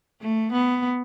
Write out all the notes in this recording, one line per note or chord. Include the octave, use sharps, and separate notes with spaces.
A3
B3